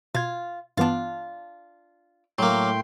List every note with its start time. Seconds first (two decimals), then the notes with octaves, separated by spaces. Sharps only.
0.15 B2 F4 G#6
0.77 G2 E3 B3 D4 F4
2.38 A2 F#3 A#3 G5 C6